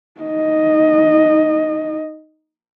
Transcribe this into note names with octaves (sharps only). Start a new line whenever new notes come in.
D#4 D#5